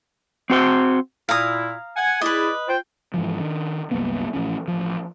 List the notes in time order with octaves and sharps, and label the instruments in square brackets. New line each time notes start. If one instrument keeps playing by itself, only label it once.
[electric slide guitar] C4 F#4 C5
[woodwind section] A#2 E4 [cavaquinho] F5 A#5 D#6
[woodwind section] F#5 G#5
[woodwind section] E4 G#4 D5 [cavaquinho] B4 D#5
[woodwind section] F4 C5 G5
[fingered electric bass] G#2 E3 F3
D#3 D4
C2 F#2 A#3 B3
A1 C3 F3 C#4
A1 F3